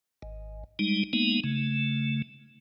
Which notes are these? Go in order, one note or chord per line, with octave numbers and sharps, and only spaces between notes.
G#1
G3 G#3 D#4
G#3 A#3 B3 D#4
C#3 A3